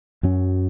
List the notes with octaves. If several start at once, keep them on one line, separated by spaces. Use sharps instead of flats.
F#2 F#3 C#4